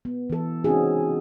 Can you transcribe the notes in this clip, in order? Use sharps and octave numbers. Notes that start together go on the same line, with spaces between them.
B3
E3 A4
C4 C#4 D#4 F#4 G#4